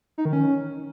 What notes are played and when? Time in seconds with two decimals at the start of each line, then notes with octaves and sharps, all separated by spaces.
0.18 D#4
0.25 D#3
0.33 C#4